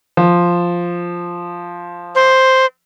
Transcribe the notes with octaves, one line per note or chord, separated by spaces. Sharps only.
F3
C5